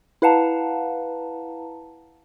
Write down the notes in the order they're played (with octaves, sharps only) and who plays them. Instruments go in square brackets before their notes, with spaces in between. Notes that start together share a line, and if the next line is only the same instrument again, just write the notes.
[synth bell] E4 B4 F5 F#5 A5 A#5